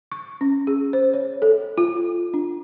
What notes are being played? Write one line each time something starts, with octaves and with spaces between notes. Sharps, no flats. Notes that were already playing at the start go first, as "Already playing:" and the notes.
C#6
C#4
G#4
C5
C#5
A4
F4
D4